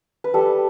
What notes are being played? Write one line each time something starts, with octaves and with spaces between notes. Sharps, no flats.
B4
G3 A4